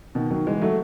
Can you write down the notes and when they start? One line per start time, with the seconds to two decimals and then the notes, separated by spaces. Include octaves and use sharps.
0.15 B2 D#3
0.30 D#3 F#3
0.47 E3 G#3
0.61 F#3 A3